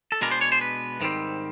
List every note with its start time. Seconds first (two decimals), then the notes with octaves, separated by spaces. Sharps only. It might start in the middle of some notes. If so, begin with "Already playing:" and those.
0.12 A4
0.21 B2 G#3 B3 D4 A#4
0.31 C5
0.41 C#5
0.52 C5
0.61 B4
1.01 G#2 D#3 G3 C4